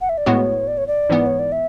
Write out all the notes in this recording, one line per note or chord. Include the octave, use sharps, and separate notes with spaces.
F#5
E5
D5
A2 G#3 B3 F#4 C#5
D5
C#5
D5
G#2 E3 B3
C#5
D5
E5